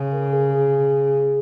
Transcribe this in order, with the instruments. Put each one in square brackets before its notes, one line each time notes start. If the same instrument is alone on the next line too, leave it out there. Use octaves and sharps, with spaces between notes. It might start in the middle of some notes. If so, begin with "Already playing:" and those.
Already playing: [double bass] C#3
[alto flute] A#4
G#4
G#4